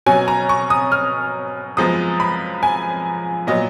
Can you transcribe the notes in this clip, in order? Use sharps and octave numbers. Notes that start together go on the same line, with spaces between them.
B2 F#3 C#4 G#5
A#5
C#6
D#6
F6
F#2 F3 G#3 B3 D#6
B5
G#5
A#2 F#3 B3 D#5